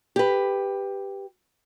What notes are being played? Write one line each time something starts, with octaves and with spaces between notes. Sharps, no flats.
G4 B4